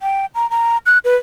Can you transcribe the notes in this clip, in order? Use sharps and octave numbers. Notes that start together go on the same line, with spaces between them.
G5
A#5
A#5
F#6
B4